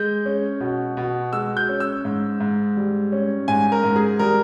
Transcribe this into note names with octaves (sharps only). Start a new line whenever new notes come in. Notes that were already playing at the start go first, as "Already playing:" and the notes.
Already playing: G#3 G6
C#4
B2
B2
G#3 E6
G6
C#4
E6
G#2
G#2
G3
C#4
G#2 G#5
A#4
G#2
G#4
G3 A#4